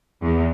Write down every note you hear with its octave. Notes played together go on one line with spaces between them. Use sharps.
E2